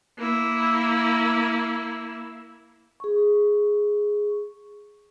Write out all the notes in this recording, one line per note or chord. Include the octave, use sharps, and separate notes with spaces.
A#3 E4
G#4 C#6